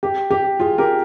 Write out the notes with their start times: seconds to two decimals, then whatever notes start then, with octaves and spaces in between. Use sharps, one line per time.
0.03 G4
0.31 G4
0.60 F4 G#4
0.78 G4 A#4